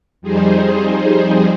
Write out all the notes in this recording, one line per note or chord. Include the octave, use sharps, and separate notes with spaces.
F2 G3 D#4 G#4 C5